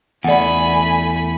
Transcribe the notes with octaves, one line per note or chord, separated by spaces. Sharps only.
E2 A3 D5 F#5 G#5 B5